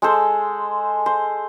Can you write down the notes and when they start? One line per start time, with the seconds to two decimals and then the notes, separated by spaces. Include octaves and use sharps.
0.02 G#3 A4 C5
1.06 C5